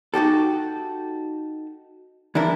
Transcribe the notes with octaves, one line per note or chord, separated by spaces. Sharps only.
D#4 F#4 G4 A4
E3 D4 E4 A#4